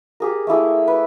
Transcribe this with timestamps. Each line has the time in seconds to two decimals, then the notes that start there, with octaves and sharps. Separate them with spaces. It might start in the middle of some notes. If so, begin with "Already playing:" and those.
0.20 G4 G#4 A#4
0.47 A3 A#3 E4 G#4
0.88 B4